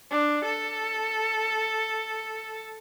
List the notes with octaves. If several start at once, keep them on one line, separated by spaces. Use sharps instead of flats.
D4
A4